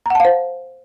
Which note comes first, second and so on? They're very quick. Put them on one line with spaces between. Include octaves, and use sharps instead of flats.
A#5 F#5 A5 F5 C5